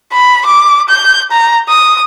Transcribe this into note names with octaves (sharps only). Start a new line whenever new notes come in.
B5
D6
G6
A#5
D#6